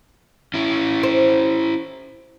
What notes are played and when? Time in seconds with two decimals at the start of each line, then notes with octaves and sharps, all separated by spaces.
0.54 C#4 E4
1.03 C5